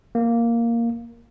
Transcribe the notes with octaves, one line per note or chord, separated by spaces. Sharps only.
A#3